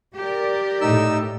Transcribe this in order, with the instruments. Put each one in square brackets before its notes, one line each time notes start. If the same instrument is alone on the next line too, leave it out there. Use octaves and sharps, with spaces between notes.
[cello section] G4 A#4 D5
[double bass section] A2 [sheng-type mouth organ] D#4 E6